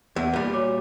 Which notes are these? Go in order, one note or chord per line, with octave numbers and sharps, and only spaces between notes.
E2
A#2 G3
F#4 C#5 D6